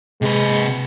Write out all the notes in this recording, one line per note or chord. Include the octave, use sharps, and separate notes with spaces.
C3 G#3 B4